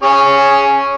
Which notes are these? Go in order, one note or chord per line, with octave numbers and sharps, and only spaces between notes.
C#4 G#4 C#5